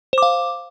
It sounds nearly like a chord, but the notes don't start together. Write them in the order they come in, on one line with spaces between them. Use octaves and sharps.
C5 D6 F5